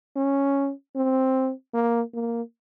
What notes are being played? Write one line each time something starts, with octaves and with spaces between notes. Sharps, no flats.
C#4
C4
A#3
A#3